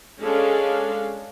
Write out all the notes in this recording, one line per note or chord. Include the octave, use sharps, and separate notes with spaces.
G#3 C#4 D4 A4 F5